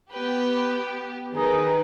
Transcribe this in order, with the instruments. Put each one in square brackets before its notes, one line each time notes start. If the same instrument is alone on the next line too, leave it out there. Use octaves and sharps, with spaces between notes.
[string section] B3 G4 [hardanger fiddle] B4 G5
[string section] D#3 B4 [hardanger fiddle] D#4 A#4 [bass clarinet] G#4